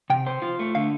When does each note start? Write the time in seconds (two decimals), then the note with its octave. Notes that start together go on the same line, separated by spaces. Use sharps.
0.10 C3 G5
0.26 C5
0.42 F4
0.59 A3
0.75 D3 F5